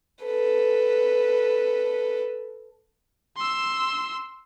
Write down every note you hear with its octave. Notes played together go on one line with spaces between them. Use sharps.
A4 B4
C6 E6